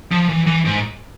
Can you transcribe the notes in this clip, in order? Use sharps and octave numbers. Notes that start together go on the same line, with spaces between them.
F3
E3
E3
G#2